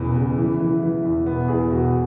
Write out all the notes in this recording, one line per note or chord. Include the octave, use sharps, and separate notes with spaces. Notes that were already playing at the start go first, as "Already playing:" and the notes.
Already playing: E1 E2 C#3 B3
C#3
E3
E3
E3
E2
E1 B3
E2 G#4
E1 F#4